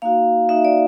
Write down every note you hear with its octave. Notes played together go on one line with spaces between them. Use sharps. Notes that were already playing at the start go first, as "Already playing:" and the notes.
A#3 D#4 F#4 F5
A#3 D#4 F#4 E5
D5